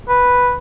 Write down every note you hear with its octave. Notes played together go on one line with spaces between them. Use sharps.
B4